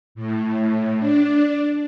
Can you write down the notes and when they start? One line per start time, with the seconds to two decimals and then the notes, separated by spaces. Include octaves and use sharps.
0.15 A2
0.98 D4